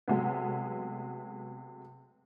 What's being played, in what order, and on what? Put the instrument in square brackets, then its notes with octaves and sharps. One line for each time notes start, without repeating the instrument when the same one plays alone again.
[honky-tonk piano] C3 F#3 G#3 A3 B3